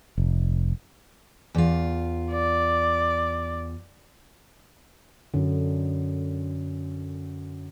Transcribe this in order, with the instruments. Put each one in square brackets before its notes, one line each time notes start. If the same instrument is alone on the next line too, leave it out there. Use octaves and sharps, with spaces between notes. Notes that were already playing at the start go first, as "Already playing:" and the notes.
[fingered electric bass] F1
[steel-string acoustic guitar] E2 F4
[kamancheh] D5
[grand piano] F#2 [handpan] D3